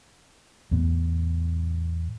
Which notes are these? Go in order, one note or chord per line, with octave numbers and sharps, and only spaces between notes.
E2 A2 B3